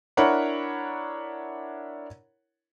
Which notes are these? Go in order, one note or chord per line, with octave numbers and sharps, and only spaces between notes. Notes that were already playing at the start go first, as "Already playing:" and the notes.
D4 E4 A#4 C#5 F#5 B5